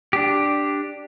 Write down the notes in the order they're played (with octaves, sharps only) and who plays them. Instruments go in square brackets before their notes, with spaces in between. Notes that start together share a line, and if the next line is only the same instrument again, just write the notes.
[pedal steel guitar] D4 G4